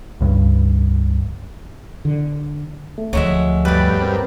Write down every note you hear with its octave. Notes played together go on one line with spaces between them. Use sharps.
C#2 G2
D3
A3
D2 F3 F#3 G#3 E5
G2 B4 D5
C4 A#4